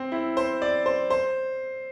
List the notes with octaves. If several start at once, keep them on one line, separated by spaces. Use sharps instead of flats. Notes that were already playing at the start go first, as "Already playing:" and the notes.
Already playing: C4
E4
C5
D5
C5
C5